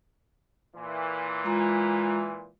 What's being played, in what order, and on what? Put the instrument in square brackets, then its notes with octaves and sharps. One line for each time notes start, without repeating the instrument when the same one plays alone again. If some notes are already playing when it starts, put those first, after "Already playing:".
[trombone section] A#2 E3
[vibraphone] G#3 F4 A#5